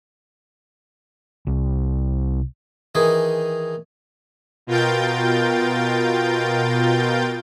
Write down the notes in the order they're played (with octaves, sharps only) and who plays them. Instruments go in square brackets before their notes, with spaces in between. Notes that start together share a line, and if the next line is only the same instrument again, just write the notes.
[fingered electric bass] C2
[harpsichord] D#3 E3 D#4 G#4
[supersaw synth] B2 F4 A#4 G5 G6 A6